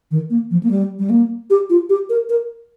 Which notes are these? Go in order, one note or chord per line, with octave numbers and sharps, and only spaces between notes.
D#3
A#3
F3
A#3
G3
G3
A#3
G4
F4
G4
A#4
A#4